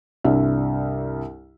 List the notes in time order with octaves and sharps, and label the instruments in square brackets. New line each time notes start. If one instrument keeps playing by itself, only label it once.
[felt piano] C2 G2 E5